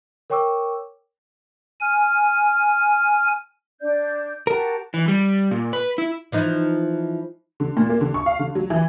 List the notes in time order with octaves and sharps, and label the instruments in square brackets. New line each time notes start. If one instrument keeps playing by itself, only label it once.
[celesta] A#4 C#5 G5 C#6 D6 E6
[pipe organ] G#5 F6
[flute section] D4 D5 G6
[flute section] F#4 G4 A5 [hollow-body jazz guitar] A#4
[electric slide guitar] E3
G3
A#2
B4
E4
[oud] E3 F3 D#4
[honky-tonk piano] D3
A#2
A#3
D3
C#6
F5
D3
F#3
E3